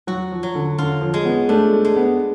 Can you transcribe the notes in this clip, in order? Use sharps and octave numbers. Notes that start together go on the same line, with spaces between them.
F#3 F#4
F3
F#3
D3
D3 F4
F3
G#3
B3
A3 D4
A3
G#3
B3